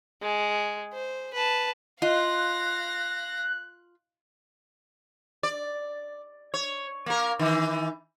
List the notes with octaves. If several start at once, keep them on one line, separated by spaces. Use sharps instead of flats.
G#3
C5
B4 A5
F4 D#5 F5 F#6 A#6
D5
C#5
A#3 A#4
D#3 E3